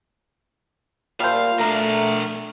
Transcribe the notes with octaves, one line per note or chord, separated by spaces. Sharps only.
A#2 G3 A3 C5 F5
B2 A3 D4 A#4 A#5